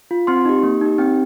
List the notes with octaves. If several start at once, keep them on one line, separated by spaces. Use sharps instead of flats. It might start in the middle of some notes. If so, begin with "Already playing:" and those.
F4
C4 C6
D#4 G4
A#3
D#4 G4
C4 G5